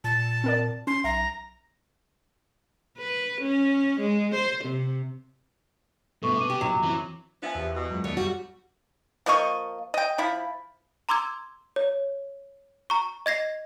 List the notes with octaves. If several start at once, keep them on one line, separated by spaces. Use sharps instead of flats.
A#2 A5
C4 A#4 D5
C#4 C6
B1 E5 A#5
B4
C#4
G#3
C5
C3
G1 D2 B2 A4 C#6
C3 B3 D6 D#7
G4
A#1 F2 F#3
F2 E3 C4 E4
F3 B3 D4 E5 G#5
E2 G4 E5
B2
F#2 F#3 G#3 F4
D#2 A3 B3 D4 C#5
F#2 G3 F#4
F3 A#3 D#5 C#6
D#5 G5
F3 E4 B5
A#5 C6 D6 E6 G#6
C#5
A#5 C#6
D#5 G#6 A#6 C7